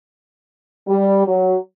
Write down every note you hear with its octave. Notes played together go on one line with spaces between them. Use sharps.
G3
F#3